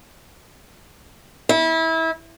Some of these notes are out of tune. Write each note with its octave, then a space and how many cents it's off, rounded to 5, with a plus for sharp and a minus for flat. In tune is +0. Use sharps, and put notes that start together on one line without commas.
E4 -25